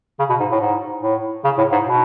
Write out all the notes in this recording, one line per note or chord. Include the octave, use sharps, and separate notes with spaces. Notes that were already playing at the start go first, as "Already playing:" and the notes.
C#3
B2
G#2
A2
G#2
A2
C#3
A2
G#2
B2